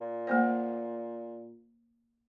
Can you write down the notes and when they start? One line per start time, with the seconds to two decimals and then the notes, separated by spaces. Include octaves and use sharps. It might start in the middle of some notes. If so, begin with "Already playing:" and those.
0.01 A#2
0.27 A3 A#3 C5